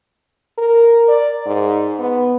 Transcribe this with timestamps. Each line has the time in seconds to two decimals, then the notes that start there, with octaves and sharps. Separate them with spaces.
0.58 A#4
1.08 D5
1.46 G#2
1.99 B3